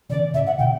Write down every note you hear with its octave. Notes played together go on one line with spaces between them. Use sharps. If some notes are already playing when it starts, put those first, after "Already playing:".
C#3 E3 D5
A2 C#3 E5
F#5
B2 D3 G5